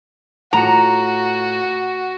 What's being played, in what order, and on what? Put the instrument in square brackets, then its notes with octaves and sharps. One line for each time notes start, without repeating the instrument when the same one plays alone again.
[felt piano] A2 F4 C#7 [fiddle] F#4 [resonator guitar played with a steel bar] A#5